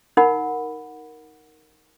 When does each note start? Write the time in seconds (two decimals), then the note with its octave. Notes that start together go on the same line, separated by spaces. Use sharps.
0.17 D#4 A#4 F#5 B5